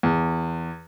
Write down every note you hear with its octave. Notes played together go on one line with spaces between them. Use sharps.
E2